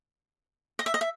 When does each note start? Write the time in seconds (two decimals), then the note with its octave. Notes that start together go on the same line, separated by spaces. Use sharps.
0.79 D#5
0.86 E5
0.94 D#5
1.01 E5